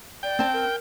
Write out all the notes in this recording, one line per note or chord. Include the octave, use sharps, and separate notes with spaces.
D5 G5
C4 A5
A#4